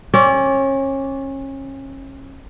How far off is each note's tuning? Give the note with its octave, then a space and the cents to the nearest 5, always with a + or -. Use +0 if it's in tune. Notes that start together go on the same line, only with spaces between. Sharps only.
C#4 -30 D5 -35